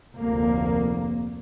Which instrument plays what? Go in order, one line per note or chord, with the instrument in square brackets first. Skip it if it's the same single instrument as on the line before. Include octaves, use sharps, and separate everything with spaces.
[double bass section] F1 D2 A#3